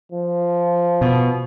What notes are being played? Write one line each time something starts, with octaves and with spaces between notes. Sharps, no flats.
F3
B2